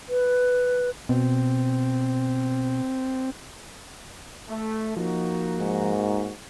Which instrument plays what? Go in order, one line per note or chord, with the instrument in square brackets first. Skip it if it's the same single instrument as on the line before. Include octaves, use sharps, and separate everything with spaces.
[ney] B4
[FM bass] B2 [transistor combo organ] C4
[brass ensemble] A3
[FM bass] F3 [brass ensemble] A#3 D#4 F#4
[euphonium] G#2